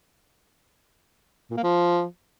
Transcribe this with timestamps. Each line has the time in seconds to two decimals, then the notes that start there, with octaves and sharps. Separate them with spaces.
1.51 A#2
1.57 A#3
1.63 F3